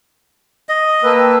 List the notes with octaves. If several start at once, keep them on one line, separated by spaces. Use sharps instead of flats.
D#5
A#3 B4 G5 A5 E6